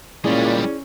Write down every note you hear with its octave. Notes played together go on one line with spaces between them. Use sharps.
A#2 G3 G#3 C#4 E4 G#4 D5